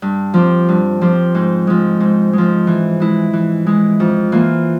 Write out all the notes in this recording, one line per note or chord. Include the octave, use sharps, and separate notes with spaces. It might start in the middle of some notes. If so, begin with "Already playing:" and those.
G2
F3 C4 G4
G2
F3 C4 G4
G#2
F3 G#3
G#2
F3 G#3
E3
G#3 E4
E3
G#3 E4
F2
E3 A#3 F4